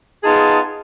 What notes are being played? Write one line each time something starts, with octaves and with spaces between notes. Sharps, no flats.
B3 D#4 F4 G#4 A5